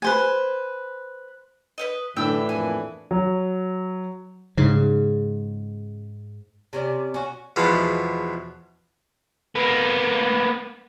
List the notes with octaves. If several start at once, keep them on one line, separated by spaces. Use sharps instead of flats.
B4 C5 G#5
B4 C#5 D#5
F#2 A2 D3 E3 D4 E5 G5 E6
F2 A#2 G#5
F#3
G#2 C#3
C3 C#4 D5
C#4 F#4
E2 B2 F3 G#3
A#3 B3